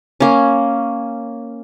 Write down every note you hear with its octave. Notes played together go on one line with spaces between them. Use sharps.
A#3 C#4